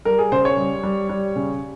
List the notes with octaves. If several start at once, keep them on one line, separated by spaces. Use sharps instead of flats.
G3 A#4
G#4
C#3 C5
C#5
G3
G3
G3
C#3